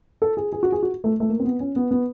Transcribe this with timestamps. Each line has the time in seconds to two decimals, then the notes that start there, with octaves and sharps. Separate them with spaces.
0.22 A4
0.37 G#4
0.53 G#4
0.63 F#4
0.72 G#4
0.83 F#4
1.04 A3
1.20 A3
1.29 A#3
1.40 C4
1.45 B3
1.60 C#4
1.76 B3
1.91 B3